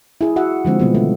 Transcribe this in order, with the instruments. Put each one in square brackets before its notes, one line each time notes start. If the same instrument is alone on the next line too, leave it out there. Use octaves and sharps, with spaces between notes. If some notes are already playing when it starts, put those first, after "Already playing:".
[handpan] E4 G#4
F#4 E5 F#5
D3 F3 G#3 C4
B2 D#3 F3 G3 B3
D3 A3